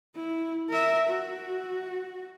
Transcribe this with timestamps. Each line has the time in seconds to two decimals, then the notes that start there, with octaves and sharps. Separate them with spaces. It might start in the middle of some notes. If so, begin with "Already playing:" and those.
0.15 E4
0.70 A#4 E5
1.09 F#4